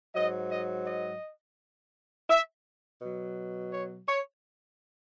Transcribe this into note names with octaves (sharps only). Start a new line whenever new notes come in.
G#2 F#3 D#5
D#5
D#5
E5
B2 F#3
C#5
C#5